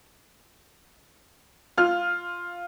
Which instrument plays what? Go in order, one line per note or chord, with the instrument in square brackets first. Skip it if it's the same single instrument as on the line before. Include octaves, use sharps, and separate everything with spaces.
[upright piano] F4 F6